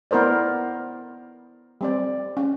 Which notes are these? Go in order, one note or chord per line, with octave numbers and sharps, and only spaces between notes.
B3 E4 A#4 C5 D5
G3 C4 D5
C#4